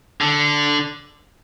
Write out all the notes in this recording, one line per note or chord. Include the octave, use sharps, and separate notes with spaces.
D3